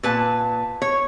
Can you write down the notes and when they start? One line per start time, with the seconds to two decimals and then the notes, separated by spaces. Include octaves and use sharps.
0.03 A#2 B4 A5
0.82 C#5